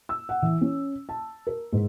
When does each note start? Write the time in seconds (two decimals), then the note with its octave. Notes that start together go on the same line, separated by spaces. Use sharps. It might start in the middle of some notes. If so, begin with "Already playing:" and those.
0.09 E6
0.29 F#5
0.42 E3
0.61 C#4
1.09 A5
1.47 A#4
1.73 G#2